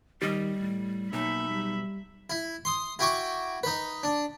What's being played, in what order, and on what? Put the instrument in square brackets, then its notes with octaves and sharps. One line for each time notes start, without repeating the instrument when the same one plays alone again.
[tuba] D#3 [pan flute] G3 [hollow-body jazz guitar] G4 D#5
[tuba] A2
[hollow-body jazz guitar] B1 [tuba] A#3 [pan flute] D#4 [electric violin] E5 B5
[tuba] G3
[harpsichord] E4
C6 D#6
E4 F#4 G5 C#6 D6
D#4 B4
D4